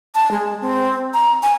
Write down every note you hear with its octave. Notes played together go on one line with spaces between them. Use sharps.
A5
G#3
C4
A#5
G#5